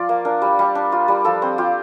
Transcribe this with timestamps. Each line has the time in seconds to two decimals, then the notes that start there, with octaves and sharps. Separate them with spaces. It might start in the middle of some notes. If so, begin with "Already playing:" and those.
Already playing: F3 F4 D5 F5
0.09 A#3
0.25 D4 A#4
0.42 G3
0.59 G3
0.75 D4
0.92 F4
1.08 G3
1.25 F3 A4
1.42 C4
1.58 F4 G4